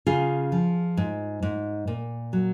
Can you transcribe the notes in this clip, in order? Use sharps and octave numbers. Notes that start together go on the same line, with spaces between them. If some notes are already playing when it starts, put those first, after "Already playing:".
C#3 F4 G#4
F3
G#2
G#2
A#2
F#3